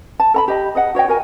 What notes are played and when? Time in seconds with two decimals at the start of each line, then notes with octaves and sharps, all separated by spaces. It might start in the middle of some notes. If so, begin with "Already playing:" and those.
0.20 A5
0.34 A4 A#5 B5
0.48 G4 D#5 B5
0.75 G#4 D#5 F#5
0.95 F#4 C#5 D#5 G5
1.08 F#4 A#4 G#5